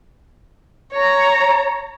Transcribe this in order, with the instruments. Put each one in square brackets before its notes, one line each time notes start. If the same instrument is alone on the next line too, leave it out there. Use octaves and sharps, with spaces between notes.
[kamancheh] C#5 A#5